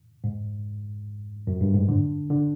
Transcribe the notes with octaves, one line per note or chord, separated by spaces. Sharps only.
G#2
F#2
G2
G#2
D3
D3